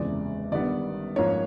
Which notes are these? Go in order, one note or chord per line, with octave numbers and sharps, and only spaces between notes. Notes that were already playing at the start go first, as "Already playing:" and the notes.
Already playing: F#1 E2 C3 F3 G#3 D5
G1 G2 D#3 G3 B3 D5
G#2 F3 A#3 C#4 C#5